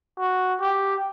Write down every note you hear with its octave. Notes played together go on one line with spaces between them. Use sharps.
F#4
G4